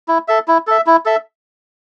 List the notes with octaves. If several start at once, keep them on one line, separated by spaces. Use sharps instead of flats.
E4
A4 E5
E4
A4 E5
E4
A4 E5